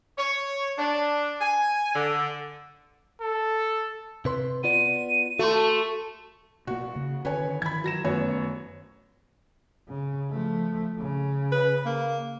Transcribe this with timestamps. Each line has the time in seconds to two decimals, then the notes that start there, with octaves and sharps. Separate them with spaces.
0.18 C#5
0.78 D4
1.41 G#5
1.95 D3
3.22 A4
4.25 C3 B4 C6
4.64 B3 F4 D5 D#7
5.39 A3 F#4 C6
6.67 B2 A#3 F#4
6.96 C#3
7.25 D3 D#3 C#4 B4 C#5 G#5
7.62 D#3 E3 B5 G#6
7.84 F#3 A#6 E7
8.05 F#2 D#3 A3 B3 C#5
9.88 C#3
10.30 F3 A3
10.99 C#3
11.52 B4
11.86 A#3